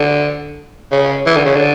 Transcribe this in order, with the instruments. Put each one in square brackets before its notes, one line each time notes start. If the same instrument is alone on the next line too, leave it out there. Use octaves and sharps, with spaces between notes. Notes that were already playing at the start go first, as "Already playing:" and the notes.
Already playing: [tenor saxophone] D3
C#3
E3
D3
C#3
D3